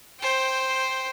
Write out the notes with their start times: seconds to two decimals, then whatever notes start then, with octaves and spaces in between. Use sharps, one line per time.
0.20 C5 G5